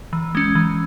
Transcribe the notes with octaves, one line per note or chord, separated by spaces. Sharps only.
E3
G#3 C#4
E3